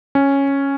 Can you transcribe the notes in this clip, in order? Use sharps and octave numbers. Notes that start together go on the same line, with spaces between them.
C#4